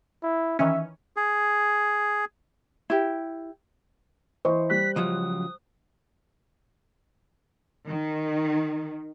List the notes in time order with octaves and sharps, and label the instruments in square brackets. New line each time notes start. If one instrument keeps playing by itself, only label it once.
[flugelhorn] E4
[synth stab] D#3 E3 C#4 [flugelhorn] E5
[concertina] G#4
[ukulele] E4 G4
[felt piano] E3 D#5 C#6 [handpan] C5
[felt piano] G3 F#6 [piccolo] B6
[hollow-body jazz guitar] C#2 F3 F#3 [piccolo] D#6
[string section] D#3